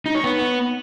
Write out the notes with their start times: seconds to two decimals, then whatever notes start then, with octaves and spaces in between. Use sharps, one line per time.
0.06 D#4
0.15 C#5
0.24 B3